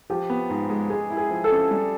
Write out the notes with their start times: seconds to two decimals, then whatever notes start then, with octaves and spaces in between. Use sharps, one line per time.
0.10 F3 G4
0.30 B3
0.50 G#2
0.70 G#3
0.90 G#3 G#4
1.10 E4
1.17 G#4
1.30 F3
1.44 A4
1.51 C#4
1.71 G3